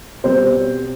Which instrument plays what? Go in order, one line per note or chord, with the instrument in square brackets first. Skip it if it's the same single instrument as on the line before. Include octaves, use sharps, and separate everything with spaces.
[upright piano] B2 G3 C4 C5